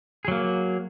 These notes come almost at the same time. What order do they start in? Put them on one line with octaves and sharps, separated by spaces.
G#4 F#3 A#3